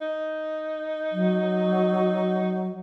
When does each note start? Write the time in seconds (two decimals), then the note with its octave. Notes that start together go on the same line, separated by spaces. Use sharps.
0.01 D#4
1.12 F#3